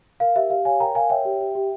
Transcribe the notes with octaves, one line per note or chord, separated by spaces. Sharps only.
A#4 F5
G4 E5
G4 F5
C#5 F5 G#5
A#4 G5 A#5
A#4 F5 G#5
C#5 E5 G5
G4
G4
G4